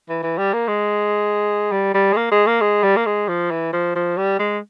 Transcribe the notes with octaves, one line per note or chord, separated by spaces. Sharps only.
E3
E3
G3
A#3
G#3
G3
G3
G#3
A#3
G#3
A#3
G#3
G3
A#3
G#3
F3
E3
F3
F3
G3
G#3